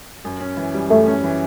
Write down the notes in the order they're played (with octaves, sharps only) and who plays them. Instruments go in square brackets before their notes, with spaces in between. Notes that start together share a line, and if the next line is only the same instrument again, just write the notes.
[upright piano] F#2
C#4
E3
G3
[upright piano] F#2 [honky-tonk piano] A3
[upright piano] C#4
E3